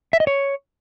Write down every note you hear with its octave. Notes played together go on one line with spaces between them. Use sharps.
E5
D#5
C#5